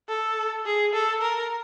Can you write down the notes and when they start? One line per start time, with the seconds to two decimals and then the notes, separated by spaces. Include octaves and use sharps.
0.09 A4
0.66 G#4
0.94 A4
1.22 A#4